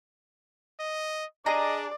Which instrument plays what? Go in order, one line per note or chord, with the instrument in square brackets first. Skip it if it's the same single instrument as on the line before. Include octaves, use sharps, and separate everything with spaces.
[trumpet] D#5
[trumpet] D4 [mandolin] G#4 A#5 [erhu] D5 [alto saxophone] D#5